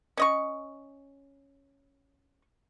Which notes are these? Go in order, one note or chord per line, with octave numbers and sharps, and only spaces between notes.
C#4 D#5 C#6